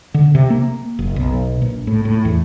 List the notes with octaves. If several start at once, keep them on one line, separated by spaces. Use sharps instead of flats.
D3
C3
A#3
F#1
B1
A#1
A2
A2
E2